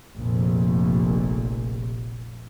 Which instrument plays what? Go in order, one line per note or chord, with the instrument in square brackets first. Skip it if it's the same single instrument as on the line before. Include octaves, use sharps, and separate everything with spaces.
[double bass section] F1 A#1